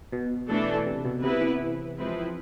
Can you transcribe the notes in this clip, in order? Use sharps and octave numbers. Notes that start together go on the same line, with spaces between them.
B2
E3 A3 D4 A4
C3
B2
C3 B3 E4 B4
E3
F3 G#3 C4 E4 B4